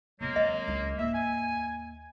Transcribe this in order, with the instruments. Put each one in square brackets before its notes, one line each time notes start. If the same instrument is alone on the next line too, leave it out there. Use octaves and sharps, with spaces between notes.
[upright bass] E2 C3 [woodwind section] F#3 G#3 A#3
[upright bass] E3 C4 [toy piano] D#5
[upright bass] C#2
[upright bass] D#2 G#2 [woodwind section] E5
[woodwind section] G#5